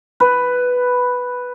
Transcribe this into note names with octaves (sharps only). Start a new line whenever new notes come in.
B4